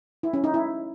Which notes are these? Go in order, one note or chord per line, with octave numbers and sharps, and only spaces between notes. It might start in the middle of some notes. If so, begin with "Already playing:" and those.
E4
C#4
D#4
E4